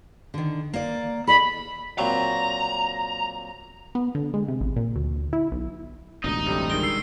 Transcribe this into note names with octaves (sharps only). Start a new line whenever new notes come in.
D3 D#3
A#3 D5
A4 D5 D#5 B5
A#2 F#3 C4 A#5
B3
D3
G#3
C3
A1
A#2
D2
E4
B1
E1 A1 D2 D#4
C3 G3 A3
D#3 G3 G#3 D7 G7
E6 C7